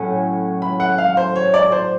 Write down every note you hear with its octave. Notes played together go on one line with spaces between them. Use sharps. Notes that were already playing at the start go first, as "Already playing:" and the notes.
Already playing: A2 F#3 C#4
B5
F#5
F5
C5
C#5
D5
C5